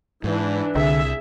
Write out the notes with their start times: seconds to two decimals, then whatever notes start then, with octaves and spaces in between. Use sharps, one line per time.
0.24 G#2 E3 D4
0.75 C2 D3 G#4 E5